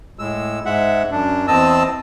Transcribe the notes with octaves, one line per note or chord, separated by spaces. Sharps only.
A2 G#3 E6
G#2 G#3 E5 F#5
F#2 D4
E2 C4 D#5 A5 E6